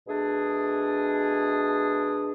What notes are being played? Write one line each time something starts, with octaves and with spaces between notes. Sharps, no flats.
B2 A3 D4 G#4